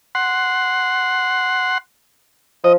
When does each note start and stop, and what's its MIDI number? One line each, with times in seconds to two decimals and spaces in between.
0.15 1.78 78
0.15 1.78 84
2.64 2.76 53
2.64 2.73 75